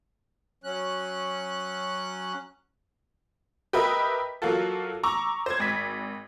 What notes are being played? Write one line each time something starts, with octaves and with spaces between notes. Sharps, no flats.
F#3 C#4 F#6
G4 A#4 B4 D#5 E5
F#3 A#3 F4 F#4 A4
A#5 C#6 D6 E6
C5 G#6
G#1 B6